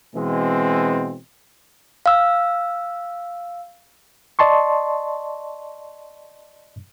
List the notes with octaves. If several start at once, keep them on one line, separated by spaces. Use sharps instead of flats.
B2 E3 G#3 C4
F5 E6
D5 D#5 A5 C6 C#6